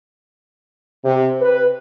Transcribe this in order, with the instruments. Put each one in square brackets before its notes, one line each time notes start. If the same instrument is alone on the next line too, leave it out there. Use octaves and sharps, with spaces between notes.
[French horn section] C3
B4